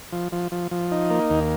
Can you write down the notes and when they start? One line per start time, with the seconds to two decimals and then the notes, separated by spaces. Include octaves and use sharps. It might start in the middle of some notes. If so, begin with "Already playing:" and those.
0.12 F3
0.32 F3
0.52 F3
0.71 F3
0.92 D#4
1.10 A#3
1.30 D#2